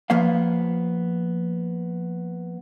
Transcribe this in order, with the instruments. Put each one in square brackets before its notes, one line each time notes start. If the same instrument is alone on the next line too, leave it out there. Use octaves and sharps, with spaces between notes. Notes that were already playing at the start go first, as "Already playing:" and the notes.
[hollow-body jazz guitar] F3 A#3 B3 F5